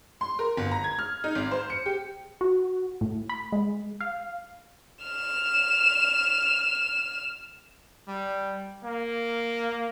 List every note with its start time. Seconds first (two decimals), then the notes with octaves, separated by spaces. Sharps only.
0.21 C6
0.39 A#4
0.57 G1
0.71 A#5
0.84 G#6
0.99 F6
1.24 D#4
1.35 G#1
1.51 C5
1.70 C#7
1.86 G4
2.41 F#4
3.01 A2
3.29 B5
3.52 G#3
4.01 F5
5.04 F6 E7
8.07 G3
8.83 A#3